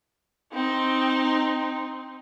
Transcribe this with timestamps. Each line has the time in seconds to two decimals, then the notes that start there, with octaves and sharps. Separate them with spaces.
0.53 C4 D#4